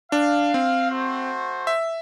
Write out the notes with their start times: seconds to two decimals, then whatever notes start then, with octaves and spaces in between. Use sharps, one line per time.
0.12 D4 F5
0.54 C4
0.91 A3 F#4 C5
1.67 E5